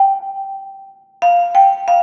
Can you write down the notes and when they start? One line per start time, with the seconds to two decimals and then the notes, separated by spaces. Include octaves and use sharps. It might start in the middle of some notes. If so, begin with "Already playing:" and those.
Already playing: G5
1.22 F5
1.55 G5
1.88 F5